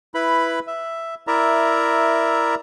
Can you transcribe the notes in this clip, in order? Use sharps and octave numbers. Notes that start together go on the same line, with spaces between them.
E4 B4 B5
E5
E4 A#4 D5 E5 A#5